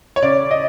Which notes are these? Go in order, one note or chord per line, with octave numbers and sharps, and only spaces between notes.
C#5
C#3 D5
D#5